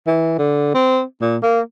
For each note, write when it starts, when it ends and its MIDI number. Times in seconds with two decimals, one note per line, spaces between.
0.07 0.34 52
0.38 0.70 50
0.74 1.03 60
1.21 1.37 46
1.43 1.60 58